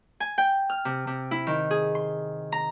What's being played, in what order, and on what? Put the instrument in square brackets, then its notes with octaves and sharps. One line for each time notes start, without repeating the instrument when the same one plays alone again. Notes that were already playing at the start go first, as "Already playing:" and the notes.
[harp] G#5
G5
F6
C3
C3
E4
D#3
G#4
C6
A#5